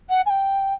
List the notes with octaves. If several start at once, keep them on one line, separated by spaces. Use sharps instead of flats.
F#5
G#5
G5